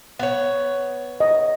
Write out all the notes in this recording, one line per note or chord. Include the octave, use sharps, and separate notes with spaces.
B3 C#5
D#5